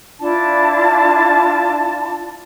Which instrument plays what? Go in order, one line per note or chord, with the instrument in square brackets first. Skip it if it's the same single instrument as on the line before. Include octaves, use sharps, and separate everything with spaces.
[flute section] D4 E4 F4 A5